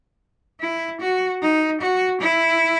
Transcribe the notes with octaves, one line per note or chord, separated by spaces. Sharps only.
E4
F#4
D#4
F#4
E4